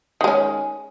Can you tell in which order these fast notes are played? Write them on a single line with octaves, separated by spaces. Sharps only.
D#3 G#3 C#4